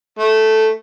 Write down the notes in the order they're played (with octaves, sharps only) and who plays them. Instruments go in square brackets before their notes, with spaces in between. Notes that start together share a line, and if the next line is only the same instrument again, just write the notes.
[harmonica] A3